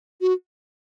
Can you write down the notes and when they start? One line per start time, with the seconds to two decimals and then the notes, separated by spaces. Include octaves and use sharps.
0.21 F#4